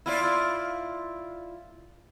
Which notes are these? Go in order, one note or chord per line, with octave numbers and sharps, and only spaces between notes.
E4 F4 D5